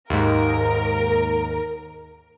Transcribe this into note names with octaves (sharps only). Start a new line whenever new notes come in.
D#2 G#2 A#4